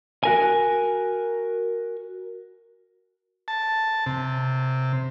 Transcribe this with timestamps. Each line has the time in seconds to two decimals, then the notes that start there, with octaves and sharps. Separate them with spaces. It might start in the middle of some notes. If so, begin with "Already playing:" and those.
0.24 F#4 A#4 G#5
3.48 A5
4.06 C3